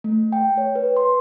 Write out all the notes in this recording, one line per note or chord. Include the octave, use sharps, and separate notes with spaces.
A3
G5
C#5
B4
C6